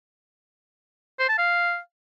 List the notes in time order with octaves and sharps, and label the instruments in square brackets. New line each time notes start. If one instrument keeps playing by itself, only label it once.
[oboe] C5
A5
F5